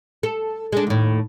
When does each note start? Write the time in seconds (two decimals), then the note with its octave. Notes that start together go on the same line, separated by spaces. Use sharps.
0.23 A4
0.72 G#3 D4
0.87 D#2 A2